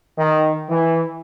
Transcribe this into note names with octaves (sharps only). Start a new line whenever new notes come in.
D#3
E3